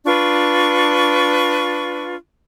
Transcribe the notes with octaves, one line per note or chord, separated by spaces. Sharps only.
D4 F4 B4 C#6